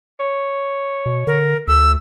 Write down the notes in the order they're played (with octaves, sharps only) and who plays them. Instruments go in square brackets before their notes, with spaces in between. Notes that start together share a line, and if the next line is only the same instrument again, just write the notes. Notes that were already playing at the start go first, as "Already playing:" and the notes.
[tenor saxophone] C#5
[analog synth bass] B2
[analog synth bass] D3 [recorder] A#4
[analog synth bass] D2 [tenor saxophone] A3 [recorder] E6